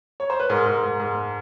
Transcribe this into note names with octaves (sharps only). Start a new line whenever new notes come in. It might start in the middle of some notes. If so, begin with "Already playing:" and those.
C#5
C5
B4
G#2 A#4
G#2
G#2
G#2